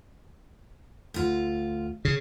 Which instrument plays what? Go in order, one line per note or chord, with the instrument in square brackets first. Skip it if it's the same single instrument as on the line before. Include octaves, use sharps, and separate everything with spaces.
[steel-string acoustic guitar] D2 F4
[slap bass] C#3